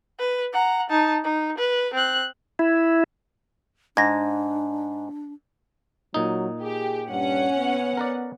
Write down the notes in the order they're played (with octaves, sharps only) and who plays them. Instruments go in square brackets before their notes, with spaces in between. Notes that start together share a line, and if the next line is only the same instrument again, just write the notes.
[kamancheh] B4
F#5 A#5
D#4 A5
D#4
B4
C4 F#6
[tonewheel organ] E4
[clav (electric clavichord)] G#2 [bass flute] D4 [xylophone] G#6 A#6
[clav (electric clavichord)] A#2 D#4 [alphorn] F#3
[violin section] G4 [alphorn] G#4
[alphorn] G2 [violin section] C#4 F#5
[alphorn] B3
[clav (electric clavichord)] A#4 B4 D5